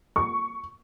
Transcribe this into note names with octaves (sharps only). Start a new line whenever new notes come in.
C#6